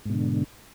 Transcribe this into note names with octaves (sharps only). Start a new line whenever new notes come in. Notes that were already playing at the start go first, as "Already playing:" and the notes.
G#2 B2 D3